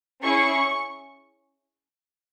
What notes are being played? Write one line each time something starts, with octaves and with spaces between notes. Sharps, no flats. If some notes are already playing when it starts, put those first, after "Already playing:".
C#4 E4 G#4 C#6